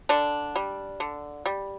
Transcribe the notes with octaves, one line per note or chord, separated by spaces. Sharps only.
D3 D4
G3
D3
G3